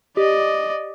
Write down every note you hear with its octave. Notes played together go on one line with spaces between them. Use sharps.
G4 D5 D#5